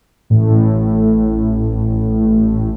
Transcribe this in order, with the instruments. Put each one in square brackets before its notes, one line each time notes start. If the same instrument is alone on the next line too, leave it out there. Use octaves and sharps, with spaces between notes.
[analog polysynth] A1 A2